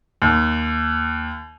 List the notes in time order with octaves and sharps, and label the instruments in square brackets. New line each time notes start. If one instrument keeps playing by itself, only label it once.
[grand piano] D#2